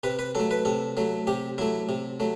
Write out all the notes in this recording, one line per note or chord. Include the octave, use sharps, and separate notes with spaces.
C3 B4
B4
F#3 A3 A4
B4
C3 A4
F#3 A3
C3 G4
F#3 A3 E4
C3
F#3 A3